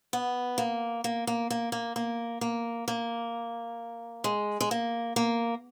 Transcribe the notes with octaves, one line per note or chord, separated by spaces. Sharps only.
B3
A#3
A#3
A#3
A#3
A#3
A#3
A#3
A#3
G#3
G#3
A#3
A#3